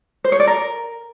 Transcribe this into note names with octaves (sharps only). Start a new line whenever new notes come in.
C5
C#5
D5
A#4